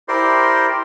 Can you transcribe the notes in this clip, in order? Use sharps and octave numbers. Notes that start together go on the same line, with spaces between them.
E4 G4 A#4 C5 D5 C6